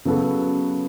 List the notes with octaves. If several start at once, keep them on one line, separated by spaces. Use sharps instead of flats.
C#3 F#3 B3 F#4 A4